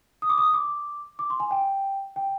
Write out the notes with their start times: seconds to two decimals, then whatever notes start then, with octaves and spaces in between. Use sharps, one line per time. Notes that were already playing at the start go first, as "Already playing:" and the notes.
0.22 D#6
0.29 D6
0.38 D#6
0.54 D6
1.19 D6
1.30 C6
1.40 G#5
1.51 G5
2.16 G5